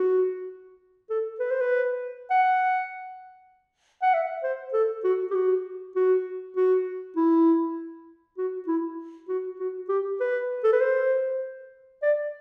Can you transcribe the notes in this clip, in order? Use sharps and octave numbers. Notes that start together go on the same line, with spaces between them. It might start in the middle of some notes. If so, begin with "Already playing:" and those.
Already playing: F#4
A4
B4
C5
B4
F#5
F#5
E5
C5
A4
F#4
G4
F#4
F#4
F#4
E4
F#4
E4
F#4
F#4
G4
B4
A4
B4
C5
D5